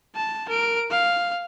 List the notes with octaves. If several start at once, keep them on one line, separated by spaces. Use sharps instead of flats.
A5
A#4 D7
F5